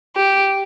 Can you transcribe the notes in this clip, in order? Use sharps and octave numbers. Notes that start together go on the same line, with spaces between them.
G4